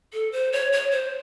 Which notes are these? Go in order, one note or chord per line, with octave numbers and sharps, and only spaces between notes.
A4
C5
C#5
C#5
C5